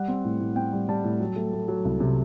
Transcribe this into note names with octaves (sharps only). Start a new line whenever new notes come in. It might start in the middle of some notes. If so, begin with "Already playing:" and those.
Already playing: G3 F#5
C4
A2
A2
C4 G5
G3
G3 A5
A2
F#3
A3
A3
F#3
C2
C3